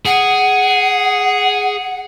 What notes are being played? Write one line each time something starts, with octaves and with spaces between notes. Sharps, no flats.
G#4 F#5